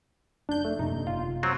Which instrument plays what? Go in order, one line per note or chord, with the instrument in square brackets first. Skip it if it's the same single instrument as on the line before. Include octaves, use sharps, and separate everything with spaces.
[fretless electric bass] F1 [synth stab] D4 G6
[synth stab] A3
[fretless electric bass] F#2 C3 A#3 [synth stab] D#4
[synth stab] G1 F4
[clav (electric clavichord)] F#3 C4